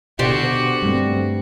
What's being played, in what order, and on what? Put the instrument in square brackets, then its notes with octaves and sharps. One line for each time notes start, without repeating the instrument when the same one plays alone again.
[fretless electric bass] B2 D3 [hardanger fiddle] F#4 [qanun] G4 C5 D5
[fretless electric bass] G2 [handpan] G3 A3 C4